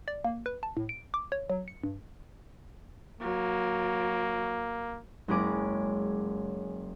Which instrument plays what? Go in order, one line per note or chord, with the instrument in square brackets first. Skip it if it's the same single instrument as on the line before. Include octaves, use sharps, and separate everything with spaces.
[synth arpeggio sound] D5
A#3
B4
A5
A2
D7
D6
C#5
F#3
C#7
G2
[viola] F#3 [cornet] A#3
[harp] F#1 G#3 C#4 G#4 D6 A#6